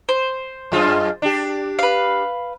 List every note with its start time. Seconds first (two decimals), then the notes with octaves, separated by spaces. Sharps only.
0.09 C5
0.72 F#2 G#3 F4
1.22 D4 G4
1.79 B4 F5